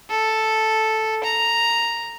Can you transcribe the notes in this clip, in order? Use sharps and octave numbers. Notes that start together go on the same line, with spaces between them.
A4
A#5